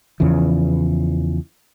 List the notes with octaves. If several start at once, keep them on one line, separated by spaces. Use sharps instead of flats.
E2 C#3 E3 F3